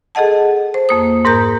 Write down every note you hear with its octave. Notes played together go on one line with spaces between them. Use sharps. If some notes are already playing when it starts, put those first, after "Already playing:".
G#4 A4 D#5 F#5 A5
C5
F2 A#3 D#6
G#2 A#4 A#5 G6